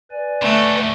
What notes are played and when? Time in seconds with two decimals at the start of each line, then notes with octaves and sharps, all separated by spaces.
0.11 B4 D5 G#5
0.42 D3 F#3 A3